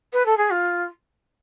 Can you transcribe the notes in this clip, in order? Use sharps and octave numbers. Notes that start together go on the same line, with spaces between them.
B4
A4
G#4
F4